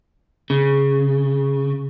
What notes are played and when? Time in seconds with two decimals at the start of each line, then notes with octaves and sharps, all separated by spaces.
0.50 C#3